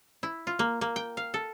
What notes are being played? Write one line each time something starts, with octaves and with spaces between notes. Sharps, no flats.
E4
F4
A#3
A#3
G5
F5
A4